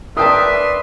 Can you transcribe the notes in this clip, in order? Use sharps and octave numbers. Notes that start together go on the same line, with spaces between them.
D4 A#4 B4 E5 G5 A5 C6 D#6